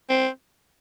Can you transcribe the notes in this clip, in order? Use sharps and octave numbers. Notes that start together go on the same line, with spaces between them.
C4